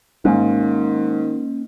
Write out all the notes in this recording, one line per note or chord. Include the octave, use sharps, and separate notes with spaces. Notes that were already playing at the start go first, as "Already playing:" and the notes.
G#2 D#3 A#3 C#4